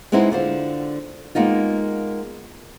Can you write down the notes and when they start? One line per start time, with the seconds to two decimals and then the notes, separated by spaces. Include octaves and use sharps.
0.12 G#3 B3 C4 D#4 E4
0.31 D3 F4 C5
1.35 G#3 A#3 B3 D#4 F4